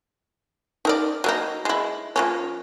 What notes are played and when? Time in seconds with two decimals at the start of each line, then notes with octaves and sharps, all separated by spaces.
0.85 D#4 A#4 D5
1.24 F#3 A#3 D#4
1.65 G#3 E4
2.16 F3 A#3 C#4